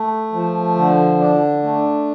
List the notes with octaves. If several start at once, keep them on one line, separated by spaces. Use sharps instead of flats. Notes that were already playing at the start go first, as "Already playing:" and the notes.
Already playing: A3
F3
D3
D4
A3